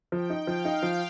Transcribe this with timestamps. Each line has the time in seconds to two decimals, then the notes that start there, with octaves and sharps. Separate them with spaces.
0.12 F3 G5
0.30 D#4
0.47 F3 F5
0.65 D#4
0.83 F3